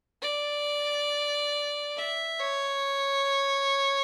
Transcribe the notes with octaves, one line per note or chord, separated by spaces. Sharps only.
D5
E5
C#5